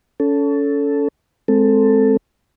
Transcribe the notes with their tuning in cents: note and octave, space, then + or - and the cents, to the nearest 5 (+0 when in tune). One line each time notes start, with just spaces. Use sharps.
C#4 +30 A4 +0
G#3 +15 C4 +0 A4 +10